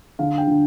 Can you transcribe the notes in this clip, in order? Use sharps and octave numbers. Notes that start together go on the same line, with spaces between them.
D3 F5
G5
D3